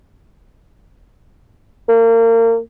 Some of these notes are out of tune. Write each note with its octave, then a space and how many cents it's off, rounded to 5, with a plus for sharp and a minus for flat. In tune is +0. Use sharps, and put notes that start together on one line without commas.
A#3 -30